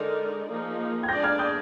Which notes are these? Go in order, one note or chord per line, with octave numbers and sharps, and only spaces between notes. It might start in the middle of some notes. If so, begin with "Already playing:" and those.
Already playing: D3 G#3 D#4 A#4 D5
F3 A#3 D#4 G#4
G#6
G#3 D4 G#4 D5 G6 A#6
F6 G#6
D#6 G6